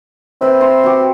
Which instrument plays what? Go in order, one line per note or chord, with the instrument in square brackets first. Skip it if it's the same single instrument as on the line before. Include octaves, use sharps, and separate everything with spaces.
[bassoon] C4 [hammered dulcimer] B4 E5
[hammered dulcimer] C5 A#5 C6
F#4 G4